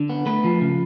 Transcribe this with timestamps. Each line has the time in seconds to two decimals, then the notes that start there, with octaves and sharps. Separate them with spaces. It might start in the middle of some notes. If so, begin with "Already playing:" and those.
Already playing: D3
0.10 B3
0.26 A3 B4
0.44 F3
0.61 C#3